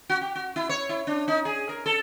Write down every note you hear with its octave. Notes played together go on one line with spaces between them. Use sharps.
F#4
G4
F#4
E4
C#5
E4
D4
D#4
G#4
A#4
A4